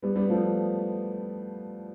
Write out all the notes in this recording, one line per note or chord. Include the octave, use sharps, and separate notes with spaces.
G3 B3
G3 B3
F3 A3